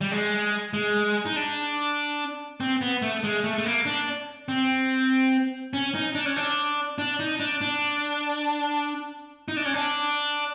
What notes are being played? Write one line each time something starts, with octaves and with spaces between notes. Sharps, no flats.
G3
G#3
G#3
D#4
D4
C4
B3
A3
G#3
A3
A3
A#3
D4
C4
C#4
D#4
D4
C#4
D4
D4
D#4
D4
D4
D#4
D4
C#4
D4